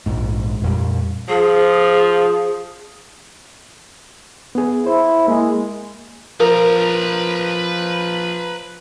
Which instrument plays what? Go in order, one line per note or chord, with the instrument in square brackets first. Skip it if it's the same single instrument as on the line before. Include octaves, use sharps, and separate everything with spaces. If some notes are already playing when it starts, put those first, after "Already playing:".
[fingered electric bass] A#1 G#2
F2 A#2 G3
[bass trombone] F3 [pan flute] G#4
[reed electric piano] B3 G#4
[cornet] E4 [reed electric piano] C5
[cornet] G#3 [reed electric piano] A#3
[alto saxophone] F3 [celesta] A#4 [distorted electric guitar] B4 A#5